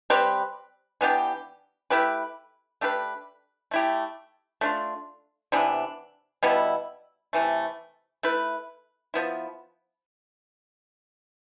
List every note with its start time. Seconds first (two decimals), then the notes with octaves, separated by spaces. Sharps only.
0.10 G3 C4 G4 B4
1.01 E3 B3 D4 G4
1.90 A3 E4 G4 B4
2.81 A3 D4 G4 B4
3.71 A3 E4 G4
4.61 A3 D4 F4
5.52 C3 E3 B3 D4
6.43 B2 G3 B3 E4
7.33 C3 E3 A3
8.23 A3 E4 B4
9.14 F3 B3 E4